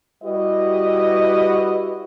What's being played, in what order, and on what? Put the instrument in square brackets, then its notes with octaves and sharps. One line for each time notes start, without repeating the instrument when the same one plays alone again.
[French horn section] G3 E4 F#4 G4 B4 D#5